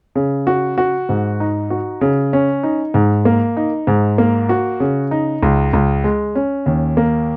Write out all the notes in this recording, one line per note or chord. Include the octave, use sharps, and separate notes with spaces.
C#3
F#4
F#4
G#2
D#4
F#4
C#3
C#4
D#4
G#2
A#3
D#4
G#2
A#3
F#4
C#3
D#4
C#2
C#2
G#3
C#4
D#2
A#3